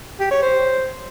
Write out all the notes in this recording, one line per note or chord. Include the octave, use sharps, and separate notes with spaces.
G4
C#5
C5